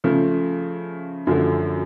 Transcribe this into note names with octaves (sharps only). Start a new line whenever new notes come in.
C#3 F3 A3
F#2 D3 F3 A3